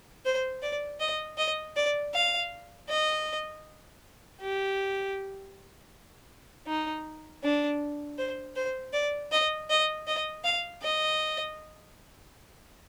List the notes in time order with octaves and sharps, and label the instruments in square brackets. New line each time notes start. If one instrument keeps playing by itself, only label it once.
[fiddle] C5
D5
D#5
D#5
D5
F5
D#5
G4
D#4
D4
C5
C5
D5
D#5
D#5
D#5
F5
D#5